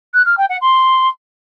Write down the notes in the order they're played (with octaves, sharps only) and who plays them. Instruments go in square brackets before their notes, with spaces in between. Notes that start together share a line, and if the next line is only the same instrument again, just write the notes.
[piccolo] F#6
F6
G5
F#5
C6